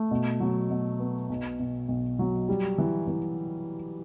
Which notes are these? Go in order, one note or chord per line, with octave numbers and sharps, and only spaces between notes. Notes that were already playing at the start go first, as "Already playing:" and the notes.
Already playing: A3
B2
F#3
B2
B3
B1
B2
B1
F#3
G3
E3
E3